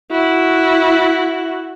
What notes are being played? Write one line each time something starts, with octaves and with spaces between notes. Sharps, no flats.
E4 F#4